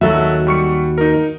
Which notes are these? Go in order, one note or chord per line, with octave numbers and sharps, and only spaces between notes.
D#2 F#3 F#4 A4 E5
G3 C#6 C#7
D#4 A#4